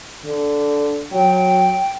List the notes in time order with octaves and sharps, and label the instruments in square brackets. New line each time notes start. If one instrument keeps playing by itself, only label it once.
[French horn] D3
[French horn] F#3 [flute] G5